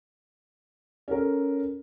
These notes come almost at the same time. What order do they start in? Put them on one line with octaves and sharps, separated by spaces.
C#4 A#4 A4